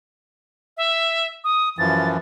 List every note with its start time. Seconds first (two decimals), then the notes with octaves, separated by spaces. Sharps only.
0.77 E5
1.44 D#6
1.79 F#2 E3 F3 A6